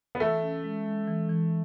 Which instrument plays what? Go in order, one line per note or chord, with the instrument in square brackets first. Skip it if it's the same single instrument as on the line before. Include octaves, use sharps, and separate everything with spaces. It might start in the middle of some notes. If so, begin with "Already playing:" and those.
[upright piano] B3
[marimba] E3 [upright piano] A3
[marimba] C#4
G#3
G#3
E3
E3